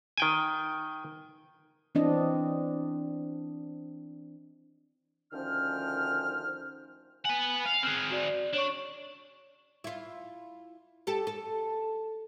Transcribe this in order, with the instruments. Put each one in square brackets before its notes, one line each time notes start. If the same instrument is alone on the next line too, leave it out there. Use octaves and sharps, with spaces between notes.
[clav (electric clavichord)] D#3 G5 G#5
[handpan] E3 C4 D4 D#5
[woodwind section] D2 D#3 F3 C#4 G5 F6
[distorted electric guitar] B4 F#5 [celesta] G#5
[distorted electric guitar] F5
[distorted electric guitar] C4 G#4 [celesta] F6 F#6
[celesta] F#4 D5
[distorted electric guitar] D4 [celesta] C#5 C#6
[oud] E4 F4
G4 A4
A4